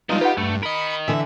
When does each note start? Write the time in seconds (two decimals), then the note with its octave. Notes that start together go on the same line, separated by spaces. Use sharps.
0.09 B2 F3 G3 G#3 D#4 F4
0.21 G4 B4 F#5
0.37 G2 A3
0.63 A#4 D#5 B5 C#7
1.08 D3 E3 E5